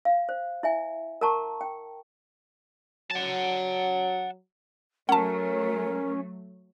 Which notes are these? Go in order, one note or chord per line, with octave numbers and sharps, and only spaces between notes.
F5
C5
E4 E5 G#5
A#4 F#5 A5 A#5 C#6
G5
F#3 F#5 A5
F#3 A3 C#4 A#4 F#5 A5